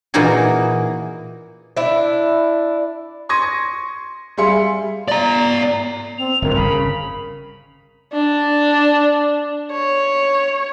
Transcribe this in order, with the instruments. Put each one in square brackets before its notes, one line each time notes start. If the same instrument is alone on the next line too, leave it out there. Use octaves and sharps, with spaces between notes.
[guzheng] A#2 E3 A#3 D#4 F#4 G#4
[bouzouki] D4 E4
[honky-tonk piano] C6 C#6 G#6 A#6 D#7
G3 G#4 E5 F5 C6 C#7
[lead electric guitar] D5 A#5
[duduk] C4 [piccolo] F7
[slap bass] G1 F2 G#2 [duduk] A#4
[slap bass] C#3 [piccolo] B5
[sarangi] D4
C#5